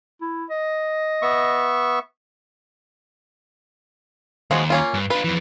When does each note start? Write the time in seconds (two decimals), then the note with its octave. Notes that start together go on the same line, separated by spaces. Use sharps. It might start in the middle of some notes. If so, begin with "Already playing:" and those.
0.21 E4
0.50 D#5
1.22 B3 E5 C#6
4.51 D#2 F3 G#3 F#4
4.70 A#3 C#4 F4
4.94 G2
5.10 D4 F4 B4
5.24 F2 E3